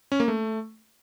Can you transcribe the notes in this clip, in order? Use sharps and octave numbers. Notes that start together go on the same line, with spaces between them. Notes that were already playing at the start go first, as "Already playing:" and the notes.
C#4
A#3
A3